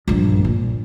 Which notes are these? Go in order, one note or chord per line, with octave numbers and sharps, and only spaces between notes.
A#1 G2
A#2